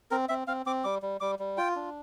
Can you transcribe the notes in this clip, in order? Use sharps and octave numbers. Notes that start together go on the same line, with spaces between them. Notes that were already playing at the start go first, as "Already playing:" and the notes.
C4 A#4
C4 E5
C4 F5
C4 D6
G3 D6
G3
G3 D6
G3
F4 G5
D4